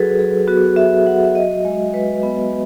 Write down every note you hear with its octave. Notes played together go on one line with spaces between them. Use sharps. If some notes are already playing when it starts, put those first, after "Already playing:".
Already playing: F#3 F#4 G#4 A4 B4
F#3 G#4
B3 F#4
F#4 E5
F#3 F#5
E5
F#4 D#5
G#3
G#3 B4
B3